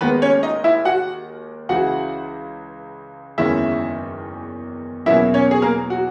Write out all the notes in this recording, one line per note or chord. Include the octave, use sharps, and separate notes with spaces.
D#2 D#3 G#3 B3 B4
C#4 C#5
D#4 D#5
E4 E5
F#4 F#5
C#2 C#3 E3 F#4 F#5
F#1 E2 D#3 G#3 C#4 E4 E5
E2 B2 F#3 A#3 C#4 E4 E5
C#4 C#5
G#4
A#3 A#4
F#4